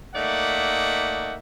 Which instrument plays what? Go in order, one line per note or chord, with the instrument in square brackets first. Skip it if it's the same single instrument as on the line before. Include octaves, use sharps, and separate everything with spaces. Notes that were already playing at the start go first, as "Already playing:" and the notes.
[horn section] A3 A#3 D#4 D5 E5 F#5